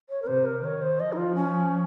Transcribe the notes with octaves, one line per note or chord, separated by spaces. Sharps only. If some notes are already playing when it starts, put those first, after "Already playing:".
C#5
A#4
C3 C5
A#4
D#3 C#5
C5
F3 D#5
D#4
F4
C#4